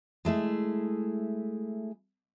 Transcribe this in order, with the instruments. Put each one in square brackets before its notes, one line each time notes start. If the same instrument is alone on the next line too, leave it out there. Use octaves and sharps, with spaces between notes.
[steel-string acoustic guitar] G#3 A3 E4 G#4